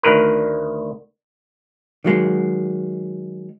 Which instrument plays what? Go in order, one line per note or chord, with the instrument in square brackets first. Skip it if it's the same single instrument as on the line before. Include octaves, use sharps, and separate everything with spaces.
[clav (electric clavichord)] D2 D#3 A#4 B4
[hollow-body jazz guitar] D#3 F#3 G#3